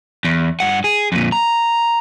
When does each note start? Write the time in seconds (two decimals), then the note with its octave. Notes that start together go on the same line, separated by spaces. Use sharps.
0.25 E2
0.60 G2 F#5
0.84 G#4
1.12 F2 A#2
1.32 A#5